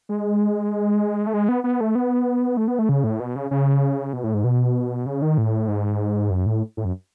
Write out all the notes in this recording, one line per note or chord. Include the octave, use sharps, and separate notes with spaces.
G#3
A3
G#3
B3
B3
A3
B3
A3
B3
A3
C#3
A2
B2
C#3
C#3
B2
A2
G#2
B2
C#3
D#3
A2
G#2
F#2
A2
A2
F#2